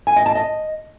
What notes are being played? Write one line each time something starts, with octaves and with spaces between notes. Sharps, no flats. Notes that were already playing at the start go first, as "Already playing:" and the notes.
G#5
D#5
A5
D#5